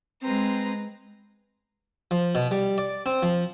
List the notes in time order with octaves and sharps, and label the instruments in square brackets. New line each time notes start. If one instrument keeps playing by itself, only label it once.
[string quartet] G#3 B4 A#5 [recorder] C4
[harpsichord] F3
B2
G3
D5
C4
F3